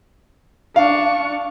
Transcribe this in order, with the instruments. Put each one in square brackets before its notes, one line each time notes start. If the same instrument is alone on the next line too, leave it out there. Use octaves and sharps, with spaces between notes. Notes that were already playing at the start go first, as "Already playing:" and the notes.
[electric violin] D4 C#6 [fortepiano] F5